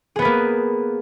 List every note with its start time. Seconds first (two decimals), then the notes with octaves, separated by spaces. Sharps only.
0.16 G#4
0.19 B3
0.22 B4
0.25 A#3